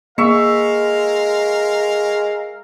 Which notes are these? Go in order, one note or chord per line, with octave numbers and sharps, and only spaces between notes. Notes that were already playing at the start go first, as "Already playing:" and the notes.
G#3 A#3 A#4 E5 F5 C#6